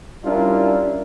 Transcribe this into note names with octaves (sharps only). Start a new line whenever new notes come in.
G3 C#4 D4 E4 F4 A#4